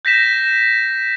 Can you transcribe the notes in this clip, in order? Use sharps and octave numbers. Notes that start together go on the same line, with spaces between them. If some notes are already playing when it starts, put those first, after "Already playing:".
G6 A#6 B6 E7